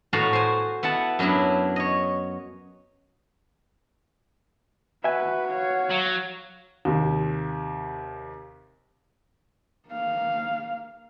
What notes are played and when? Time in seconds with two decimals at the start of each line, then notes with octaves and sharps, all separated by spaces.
0.13 A2 B3 F#4 F5 A5 A#5
0.33 C5 G#5
0.83 B3 E4 F#5 A5
1.19 F#2 F#3 B3 D4 E4
1.76 C#5 D#5
5.04 F#4 B4 E5 G#5
5.49 C#5 F5
5.91 F#3
6.85 D#2 C3
9.89 A#3 F5